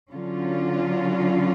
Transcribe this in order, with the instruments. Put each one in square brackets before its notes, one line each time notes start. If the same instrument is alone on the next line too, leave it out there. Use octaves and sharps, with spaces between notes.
[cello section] D3 F#3 C#4 F4